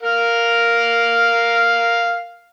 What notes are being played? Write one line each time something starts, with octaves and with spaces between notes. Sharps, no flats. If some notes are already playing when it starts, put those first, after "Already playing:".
A#4 F5